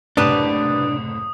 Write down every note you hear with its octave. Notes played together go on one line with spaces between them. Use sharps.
F#1 C2 A2 D4 G4 B4 A5 D#6